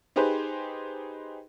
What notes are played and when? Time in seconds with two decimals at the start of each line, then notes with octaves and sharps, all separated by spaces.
0.16 D#4 G4 G#4 B4 C5